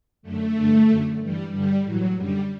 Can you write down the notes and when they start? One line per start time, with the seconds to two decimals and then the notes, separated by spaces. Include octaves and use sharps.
0.22 F#2 D3 A3
0.55 G2 D3
0.87 F#2 D3
1.20 G2 E3 G3
1.51 G2 D3 G3
1.84 A2 E3 F#3
2.16 F#2 D3 G3